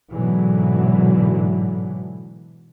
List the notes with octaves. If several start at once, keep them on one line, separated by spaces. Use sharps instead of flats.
G#2 B2 D3 E3 F#3